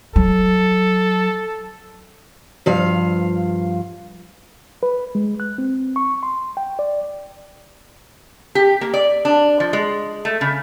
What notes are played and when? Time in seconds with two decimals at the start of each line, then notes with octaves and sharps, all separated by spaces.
0.16 F#3 A4
2.66 G2 F3 F5
4.83 B4
5.15 G#3
5.40 F#6
5.58 C4
5.96 C#6
6.23 C6
6.57 G5
6.79 D5
8.55 G4
8.81 A#3
8.94 D5
9.25 D4
9.60 F3
9.73 G#3
10.25 A3
10.41 C#3